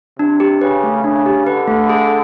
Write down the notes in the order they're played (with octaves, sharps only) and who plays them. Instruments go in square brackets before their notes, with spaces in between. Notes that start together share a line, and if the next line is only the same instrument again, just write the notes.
[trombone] C3 [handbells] D4
[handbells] G4
[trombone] C#3 [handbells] B4
[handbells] A3
[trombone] C#3 [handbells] D4
[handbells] G4
[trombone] D3 [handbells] B4
[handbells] A3
G#4